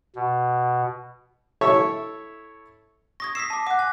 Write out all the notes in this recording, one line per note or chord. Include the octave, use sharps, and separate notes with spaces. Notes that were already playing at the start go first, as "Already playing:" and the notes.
B2
E4 A4 C#5 E5 C#6
C#6 D#6 G#6 A#6
D#6 E6 B6 C7 E7
A5 D6
F#5 D6 F#6
G#5